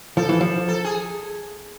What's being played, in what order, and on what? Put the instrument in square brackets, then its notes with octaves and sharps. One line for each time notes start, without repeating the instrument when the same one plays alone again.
[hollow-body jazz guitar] F3 [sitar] A4
[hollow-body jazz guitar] E3
F3
[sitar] A4
G#4